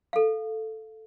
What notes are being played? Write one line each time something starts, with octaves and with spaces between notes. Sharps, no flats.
A4 F5